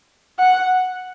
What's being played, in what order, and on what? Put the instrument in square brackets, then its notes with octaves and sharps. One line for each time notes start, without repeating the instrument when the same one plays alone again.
[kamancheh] F#5